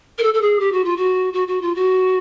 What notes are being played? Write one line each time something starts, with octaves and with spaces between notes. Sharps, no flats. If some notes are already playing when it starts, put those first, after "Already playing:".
A#4
A4
A4
G#4
G4
F#4
F4
F#4
F#4
F#4
F4
F#4